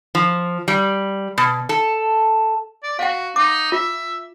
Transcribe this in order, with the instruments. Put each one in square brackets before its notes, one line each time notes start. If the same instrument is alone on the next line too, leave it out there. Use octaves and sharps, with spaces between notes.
[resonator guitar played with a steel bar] F3
G3
B2
A4
[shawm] D5
[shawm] F#4 [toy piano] F5 F#5
[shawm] D#4 [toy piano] D6
[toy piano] F4 [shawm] E5